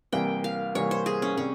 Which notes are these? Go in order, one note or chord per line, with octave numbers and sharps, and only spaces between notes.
C2 C3 E3 A#3 G5
F5
C2 C3 E3 A#3 C#5
C5
G#4
C#4
C3 G3 C#4